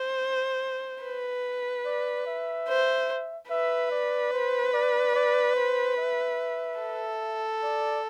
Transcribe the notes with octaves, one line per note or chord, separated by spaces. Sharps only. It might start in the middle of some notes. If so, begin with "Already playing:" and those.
Already playing: C5
B4
D5
E5
C5
B4 E5
D5
C5
D5
D5
C5
E5
A4
D5